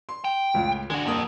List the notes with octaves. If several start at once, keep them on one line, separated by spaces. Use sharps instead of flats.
C6
G5
C#2 A2 F4
D3 G#3 F#4
D#1 F2 A#3 D#6